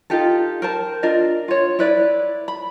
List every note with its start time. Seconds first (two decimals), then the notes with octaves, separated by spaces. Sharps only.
0.10 D#4 F4 G4 A4
0.62 A#4 C5 A5
1.03 D4 F4 A#4 D#5
1.48 F4 C#5
1.79 E4 B4 D5
2.48 B5